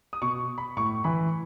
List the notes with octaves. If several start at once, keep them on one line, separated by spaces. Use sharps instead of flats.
D#6
B2 C#6
B5
A2 C#6
E3 B5